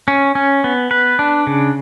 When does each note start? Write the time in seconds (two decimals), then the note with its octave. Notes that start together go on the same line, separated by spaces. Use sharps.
0.08 C#4
0.35 C#4
0.64 B3
0.91 B4
1.19 D4
1.47 C#3